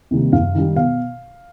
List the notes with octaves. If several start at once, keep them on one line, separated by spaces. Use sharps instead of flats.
C3 D#3 G3 A#3
F#2 F5
D#3 G3
B2 F5